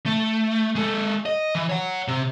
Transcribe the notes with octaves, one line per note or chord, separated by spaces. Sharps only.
A3
G#3 A4
D#5
E3
C#5 F#5
C3